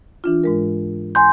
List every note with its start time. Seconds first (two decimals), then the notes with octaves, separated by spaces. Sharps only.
0.24 E3 D4 F4
0.44 G#2 G#3 A#4
1.15 G#5 C6 G6